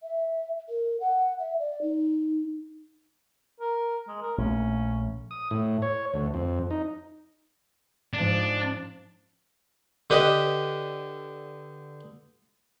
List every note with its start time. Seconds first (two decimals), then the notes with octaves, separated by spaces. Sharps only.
0.03 E5
0.69 A#4
1.00 F#5
1.39 E5
1.59 D5
1.82 D#4
3.61 A#4
4.08 G#3
4.22 A#4
4.38 A#1 A3 C#4
5.31 D#6
5.51 A2
5.82 C#5
6.14 D2
6.34 F2
6.71 D#4
8.14 G#2 F3 D4
10.10 D3 G4 B4 D#5